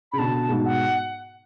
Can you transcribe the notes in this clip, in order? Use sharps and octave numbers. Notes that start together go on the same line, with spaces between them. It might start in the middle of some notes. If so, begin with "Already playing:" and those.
C#3 B5
B2 D3 A5
G#2 B2
F#5